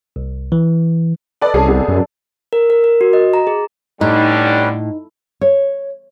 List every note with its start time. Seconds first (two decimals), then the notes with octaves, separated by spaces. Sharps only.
0.16 C2
0.52 E3
1.41 A4 B4 D5 D#5
1.54 C2 C#4 G#4 A4 D5
1.68 C3 B3 G#4
1.88 F#2
2.53 A#4
2.70 A#4
2.84 A#4
3.01 F#4
3.13 D#5
3.34 A#5
3.47 G#4
4.01 A2 D3 G3 C#4 D#4 B4
5.41 C#5